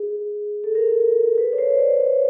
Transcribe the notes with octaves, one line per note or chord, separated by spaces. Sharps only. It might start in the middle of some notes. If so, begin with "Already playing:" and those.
Already playing: G#4
A4
A#4
B4
C#5
C5
D5
C#5